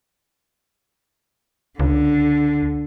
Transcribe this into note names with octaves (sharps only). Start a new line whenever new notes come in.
C#2 D3